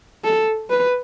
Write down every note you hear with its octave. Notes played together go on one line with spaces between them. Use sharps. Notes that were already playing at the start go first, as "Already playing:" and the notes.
A4
B4